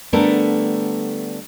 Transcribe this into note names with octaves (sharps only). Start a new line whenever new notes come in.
D3 G3 A3 B3 A4 A#4